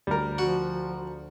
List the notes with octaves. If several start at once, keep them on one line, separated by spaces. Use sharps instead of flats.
D2 G3 A#4
F3 F#4